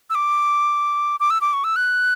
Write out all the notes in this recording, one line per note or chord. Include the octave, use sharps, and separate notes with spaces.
E6
D6
D6
E6
D6
C#6
E6
F#6